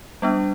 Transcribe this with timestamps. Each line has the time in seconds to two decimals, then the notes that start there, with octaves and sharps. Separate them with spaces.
0.22 G3 B3 D4